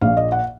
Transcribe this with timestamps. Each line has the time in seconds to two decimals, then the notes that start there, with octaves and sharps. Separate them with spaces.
0.01 A#1 A#2 F5
0.17 D#5
0.32 F#5